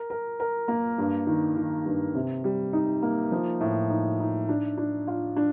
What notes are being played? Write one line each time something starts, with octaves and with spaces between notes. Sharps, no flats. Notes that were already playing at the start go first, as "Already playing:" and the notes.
Already playing: A#4
A#4
A#4
A#3
G2
D#3
D#3
G2
C3
G3
D#4
A#3
F3
A2
D#4
D#4
D4
D4
F4
D4